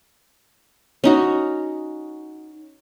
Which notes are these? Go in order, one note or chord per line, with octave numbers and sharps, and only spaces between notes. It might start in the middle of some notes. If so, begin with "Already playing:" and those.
C#4 D#4 F#4